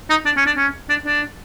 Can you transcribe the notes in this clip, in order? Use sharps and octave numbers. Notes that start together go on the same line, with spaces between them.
D#4
D4
C#4
D4
C#4
D4
D4